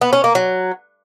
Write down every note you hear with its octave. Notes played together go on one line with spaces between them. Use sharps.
B3
C#4
A#3
F#3